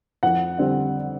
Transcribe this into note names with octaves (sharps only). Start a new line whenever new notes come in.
F2 F#5
D3 G3 C4